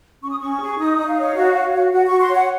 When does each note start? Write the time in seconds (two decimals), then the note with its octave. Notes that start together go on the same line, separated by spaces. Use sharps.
0.23 C#4 C#6
0.31 D#6
0.39 C#4 C#6
0.61 G#4
0.79 D#4 D#6
0.97 D#4 D#5
1.07 F5
1.17 C#5
1.35 F#4
1.54 C#5
1.73 F#4
1.92 F#4 F#5
2.06 F#4 C#6
2.20 C6
2.30 C#5 F#5